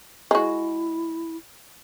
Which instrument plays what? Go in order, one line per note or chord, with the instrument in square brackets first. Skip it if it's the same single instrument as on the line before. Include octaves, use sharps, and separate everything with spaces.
[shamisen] G#3 F#4 [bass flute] E4